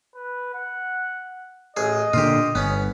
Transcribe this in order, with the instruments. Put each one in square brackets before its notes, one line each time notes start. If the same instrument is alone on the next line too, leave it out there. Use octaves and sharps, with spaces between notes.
[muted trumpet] B4
F#5
[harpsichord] A1 G#4 [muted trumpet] D#5
[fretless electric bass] A#2 D3 [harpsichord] F4 G4
[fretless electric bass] G1 [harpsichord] B3 C#4